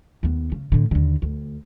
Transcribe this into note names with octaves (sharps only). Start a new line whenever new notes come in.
D#2 B3
C#3
A2 D3
D#2 D3
D2